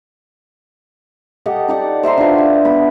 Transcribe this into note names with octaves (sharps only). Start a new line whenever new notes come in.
G4 A4 D#5 F#5
D#4 D5 F#5
C5 E5 A#5 C6
D4 F4 B4
E5
B3 B5